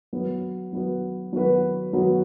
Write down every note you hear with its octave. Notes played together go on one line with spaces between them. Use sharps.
F#3 B3 F#4 B4
F#3 B3 F#4 B4
F#3 B3 F#4 B4
F#3 B3 F#4 B4